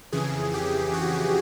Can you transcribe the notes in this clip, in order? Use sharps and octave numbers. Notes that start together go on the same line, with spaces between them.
F2 C#3 E3 G#4
G4
F#4